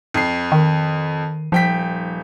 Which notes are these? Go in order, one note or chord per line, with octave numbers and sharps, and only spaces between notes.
F2 C7
D#3
D#1 F3 G5 B6